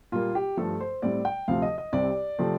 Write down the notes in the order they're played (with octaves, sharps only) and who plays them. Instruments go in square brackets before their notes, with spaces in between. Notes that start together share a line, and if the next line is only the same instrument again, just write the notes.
[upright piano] A#2 G3 A#3 F4
G4
G2 F3 A3 A4
C5
A2 G3 C4 D5
G5
D2 C3 F3 C4 F5
D#5
D#5
C2 C3 G3 C4 D5
C3 F3 A3 C4